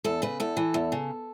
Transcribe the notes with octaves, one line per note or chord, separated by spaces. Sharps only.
E2 A4
C#3 B4
E2 A4
E3
E2
C#3